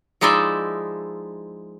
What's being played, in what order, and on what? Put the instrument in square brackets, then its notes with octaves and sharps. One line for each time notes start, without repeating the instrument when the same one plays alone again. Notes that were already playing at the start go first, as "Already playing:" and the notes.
[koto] F3 G#3 D#4 E4 D5 E5